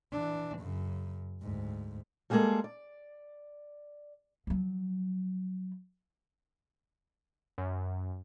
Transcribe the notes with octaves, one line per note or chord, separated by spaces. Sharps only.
E3 D4
F#2 C#3
D2 G#2
G3 G#3 A#3 B3 G#4 A4
D5
F3 F#3
F#2